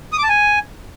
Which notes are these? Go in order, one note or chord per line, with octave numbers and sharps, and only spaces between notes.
D#6
D6
A5
G#5